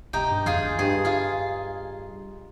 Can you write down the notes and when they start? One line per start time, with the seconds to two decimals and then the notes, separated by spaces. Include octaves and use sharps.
0.13 B2 D#4 G4
0.30 G2
0.46 F2 F4 G#4
0.63 F2
0.78 G2 G#4
1.05 F4 G#4